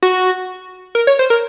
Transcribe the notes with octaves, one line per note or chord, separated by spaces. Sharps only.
F#4
A#4
C#5
C5
A#4